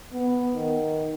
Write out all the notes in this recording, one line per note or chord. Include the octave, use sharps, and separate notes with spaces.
B3
D#3